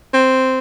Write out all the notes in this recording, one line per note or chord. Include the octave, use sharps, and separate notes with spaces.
C4